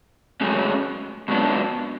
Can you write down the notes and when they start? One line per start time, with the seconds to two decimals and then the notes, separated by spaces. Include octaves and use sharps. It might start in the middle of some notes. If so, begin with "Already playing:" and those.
0.41 G#2 F#3 A3 C#4 G#4
1.28 G#2 F#3 B3 D4 F4